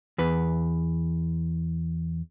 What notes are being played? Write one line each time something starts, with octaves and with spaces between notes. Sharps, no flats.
E2 B4